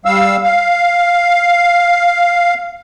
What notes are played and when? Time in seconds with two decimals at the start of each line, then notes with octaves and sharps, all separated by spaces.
0.05 G3 F5 E6
0.43 F5